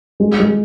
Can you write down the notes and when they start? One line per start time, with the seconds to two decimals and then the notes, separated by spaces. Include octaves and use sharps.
0.20 G#3
0.40 G#3